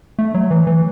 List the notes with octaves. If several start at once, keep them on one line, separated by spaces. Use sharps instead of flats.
A3
F#3
E3
E3